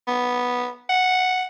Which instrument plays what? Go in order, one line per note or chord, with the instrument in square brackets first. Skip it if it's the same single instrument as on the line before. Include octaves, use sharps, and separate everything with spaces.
[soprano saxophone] B3
F#5